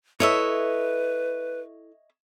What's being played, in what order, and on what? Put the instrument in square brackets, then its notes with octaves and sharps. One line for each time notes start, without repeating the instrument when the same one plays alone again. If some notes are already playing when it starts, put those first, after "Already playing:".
[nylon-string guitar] E4 A4 [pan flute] B4 [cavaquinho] C#5 D#5 E5